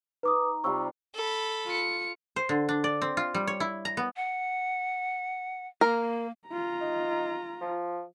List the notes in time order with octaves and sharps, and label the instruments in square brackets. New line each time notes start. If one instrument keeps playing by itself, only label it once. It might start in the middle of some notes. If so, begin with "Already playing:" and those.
[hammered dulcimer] D#4 [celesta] B4 D6 D#6
[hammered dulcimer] C3 G3 F4 [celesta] C#6 E6
[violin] A4 B5
[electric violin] F4 C#7
[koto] C5
D3
D4
D5
C4
F4
G3
C#5
E4
A#5
B3
[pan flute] F#5
[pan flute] A#3 [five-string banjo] A#4
[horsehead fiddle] F4 A#5
[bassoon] D#4
F3